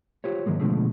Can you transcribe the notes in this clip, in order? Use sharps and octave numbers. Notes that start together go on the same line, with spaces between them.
F4 G4 C5 C#5
G#2 D#3 F#3 G#3 A#3
B2 D3 F3 G#3 A3